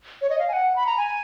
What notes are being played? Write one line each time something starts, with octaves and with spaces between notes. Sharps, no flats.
C#5
D#5
F5
G#5
F#5
B5
A#5
G#5